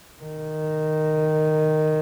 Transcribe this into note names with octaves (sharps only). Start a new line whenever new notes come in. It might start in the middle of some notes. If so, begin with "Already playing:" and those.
D#3